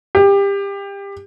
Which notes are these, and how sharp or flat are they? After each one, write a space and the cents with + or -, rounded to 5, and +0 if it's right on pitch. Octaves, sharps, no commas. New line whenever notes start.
G4 +25